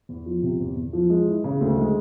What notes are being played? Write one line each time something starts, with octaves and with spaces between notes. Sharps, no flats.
E2
F3
C3
E2
E2
F3
G#3
E3
C#3
D2
G#3